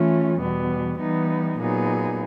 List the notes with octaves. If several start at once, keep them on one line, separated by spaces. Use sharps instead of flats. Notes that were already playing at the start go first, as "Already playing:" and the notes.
Already playing: E3 A3 C#4 F4
E2 B2 G3 B3
E3 G3 B3 D#4
A#2 F#3 B3 D#4 G#4